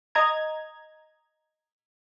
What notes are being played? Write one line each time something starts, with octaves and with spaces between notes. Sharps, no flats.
D#5 A#5 G#6